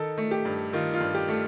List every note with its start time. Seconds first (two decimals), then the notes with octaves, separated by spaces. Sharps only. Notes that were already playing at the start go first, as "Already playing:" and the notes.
Already playing: D#3 A4
0.18 A3
0.31 G4
0.45 G2
0.73 D#3 F4
0.94 F4
1.01 G2
1.15 G4
1.29 A3